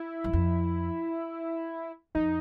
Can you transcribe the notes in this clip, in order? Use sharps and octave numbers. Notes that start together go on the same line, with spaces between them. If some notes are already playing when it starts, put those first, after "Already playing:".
Already playing: E4
F#2
F2
F2 D#4